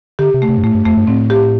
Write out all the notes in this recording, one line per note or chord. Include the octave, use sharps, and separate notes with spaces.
D3 G4
C3
A3
C3
G2
A2 A3
G2
F2 A3
G2
A2 C4
G4